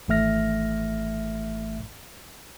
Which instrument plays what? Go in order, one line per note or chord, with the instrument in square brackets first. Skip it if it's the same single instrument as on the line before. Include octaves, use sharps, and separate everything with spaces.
[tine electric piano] G#1 E3 A3 E5 F6 A#6